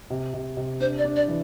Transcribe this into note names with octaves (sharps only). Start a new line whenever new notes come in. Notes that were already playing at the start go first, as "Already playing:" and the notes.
C3
C3
C3
D4 C5
D5
D4
D5
E3